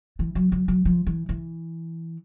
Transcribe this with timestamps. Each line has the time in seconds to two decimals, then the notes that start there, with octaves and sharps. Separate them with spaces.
0.19 E3
0.35 F#3
0.52 F#3
0.68 F#3
0.85 F3
1.06 E3
1.29 E3